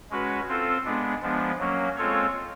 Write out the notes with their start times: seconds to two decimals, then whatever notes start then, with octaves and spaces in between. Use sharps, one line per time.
0.10 G#3 C#4 F#4 B4
0.48 C4 F4 A4 C5
0.85 G#3 B3 D4
1.22 F3 G#3 B3 D4
1.59 F#3 A#3 C#4
1.96 G#3 C4 F4 A4 C#5